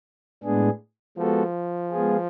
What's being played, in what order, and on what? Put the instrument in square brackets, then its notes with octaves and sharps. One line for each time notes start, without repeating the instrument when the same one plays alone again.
[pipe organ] A2 G#3 B3 D4 G#4
[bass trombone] F3 [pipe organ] G#3 B3 F#4 A4
[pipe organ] G#3 B3 F4 G#4